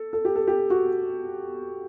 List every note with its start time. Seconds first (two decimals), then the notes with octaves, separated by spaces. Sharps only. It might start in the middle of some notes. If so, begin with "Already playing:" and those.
Already playing: A4
0.13 A4
0.25 G4
0.36 A4
0.47 G4
0.70 F#4